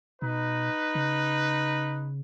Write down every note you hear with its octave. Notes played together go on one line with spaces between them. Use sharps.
B2 D#4 B4
C#3